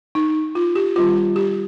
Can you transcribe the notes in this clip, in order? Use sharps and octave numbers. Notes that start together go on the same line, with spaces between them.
D#4
F4
G4
D#3 G3 C4 F4
G4